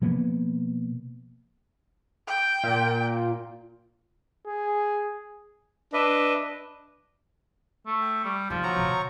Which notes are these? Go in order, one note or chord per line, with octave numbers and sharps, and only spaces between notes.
B2 F3 A#3 B3
G5
A#2
G#4
D4 B4 D#5 E5
A3
G5
G3
D#3 F3 A#3
F#3 A#5 C#6
B2 D3